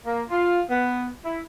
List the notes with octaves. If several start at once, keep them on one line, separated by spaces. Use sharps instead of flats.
A#3
F4
B3
E4